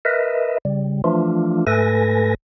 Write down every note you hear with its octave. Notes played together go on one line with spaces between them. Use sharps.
A#4 B4 D#5 E5
C#3 G3
E3 F3 A3 D4 F4
G#2 A3 A4 B4 G#5 A#6